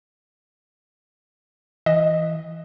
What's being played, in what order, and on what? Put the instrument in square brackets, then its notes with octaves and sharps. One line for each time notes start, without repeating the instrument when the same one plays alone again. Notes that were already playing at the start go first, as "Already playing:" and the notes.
[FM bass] E3 [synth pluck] D#5